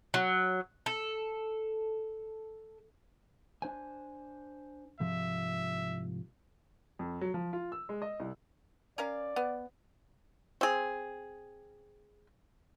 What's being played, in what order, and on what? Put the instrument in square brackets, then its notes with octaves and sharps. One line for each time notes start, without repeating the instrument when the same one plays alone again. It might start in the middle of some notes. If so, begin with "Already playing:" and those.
[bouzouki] F#3
A4
[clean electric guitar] D4 C5 G#5
[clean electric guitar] C2 G#2 F3 [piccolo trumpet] E5
[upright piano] F2
F#3
F3
F4
E6
G#3
D#5
C2
[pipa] C#4 A#4 F5 [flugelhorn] D5
[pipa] B3
C4 G#4